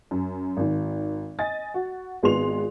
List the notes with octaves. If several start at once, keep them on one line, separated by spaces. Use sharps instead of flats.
F#2
G#1 D#3
D#5 G#5 A6
F#4
G#1 G#3 B3 F4 C6 F7